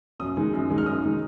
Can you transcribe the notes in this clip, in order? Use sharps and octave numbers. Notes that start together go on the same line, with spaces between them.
F#2 D#6
D#3 G#3 D#4
F#2
D#3 G#3 D#4
F6
F#2 D#6
D#3 G#3 D#4